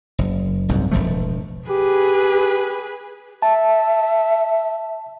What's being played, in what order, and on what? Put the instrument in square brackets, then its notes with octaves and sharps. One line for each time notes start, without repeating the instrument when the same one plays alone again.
[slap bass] F#1
F#1 C2 G#2
E1 E2 F3 A3
[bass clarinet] G4 [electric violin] G#4 B4
[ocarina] E5 [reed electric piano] A5